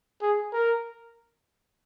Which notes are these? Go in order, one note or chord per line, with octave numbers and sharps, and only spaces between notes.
G#4
A#4